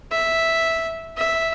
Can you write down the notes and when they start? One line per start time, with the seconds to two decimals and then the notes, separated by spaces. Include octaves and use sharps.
0.12 E5
1.17 E5